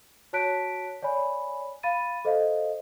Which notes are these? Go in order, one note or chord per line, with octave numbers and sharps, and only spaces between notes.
F#4 C#5 A5 F#6 B6 D7
C#5 D5 G#5 B5
F5 B5 A6 D#7
A4 C5 D#5 F5